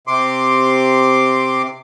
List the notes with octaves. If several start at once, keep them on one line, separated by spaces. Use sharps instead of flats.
C3 C6 D6